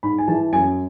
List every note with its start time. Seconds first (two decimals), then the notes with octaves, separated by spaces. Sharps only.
0.03 G#2 B5
0.18 G#5
0.28 E3 A5
0.53 F#2 G#5